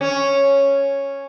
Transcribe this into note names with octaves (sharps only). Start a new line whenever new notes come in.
C#4